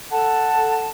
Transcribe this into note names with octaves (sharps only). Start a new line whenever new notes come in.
A4 F#5 A5